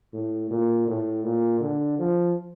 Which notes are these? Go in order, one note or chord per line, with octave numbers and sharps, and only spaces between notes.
A2
A#2
A2
A#2
D3
F3